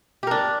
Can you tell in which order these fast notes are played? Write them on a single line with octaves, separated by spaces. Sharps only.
G4 A#4 D4